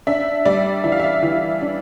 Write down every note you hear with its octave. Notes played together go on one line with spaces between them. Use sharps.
D4 E5
G3 D5
E3 E5
F5
E5
E3
D4